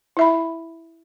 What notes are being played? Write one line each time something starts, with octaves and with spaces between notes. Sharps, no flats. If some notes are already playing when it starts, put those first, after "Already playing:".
E4 E5 B5